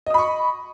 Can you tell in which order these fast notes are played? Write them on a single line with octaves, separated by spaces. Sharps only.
D#5 D#6 B5 C#6